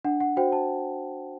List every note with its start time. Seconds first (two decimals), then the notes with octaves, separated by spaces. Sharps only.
0.05 D4 F#5
0.20 F#5
0.37 F#4 C5 G5
0.52 A5